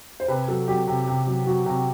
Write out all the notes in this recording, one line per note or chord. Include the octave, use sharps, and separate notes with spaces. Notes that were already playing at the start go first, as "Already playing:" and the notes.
C5
C3 B4
F#3 A4
F#3 G4
C3
C3
F#3
F#3 F#4
C3 F#4